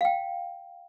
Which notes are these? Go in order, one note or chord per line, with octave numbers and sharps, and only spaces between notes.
F5 G5